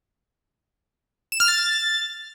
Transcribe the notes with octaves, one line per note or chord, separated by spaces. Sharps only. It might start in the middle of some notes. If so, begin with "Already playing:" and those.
E7
F6
A6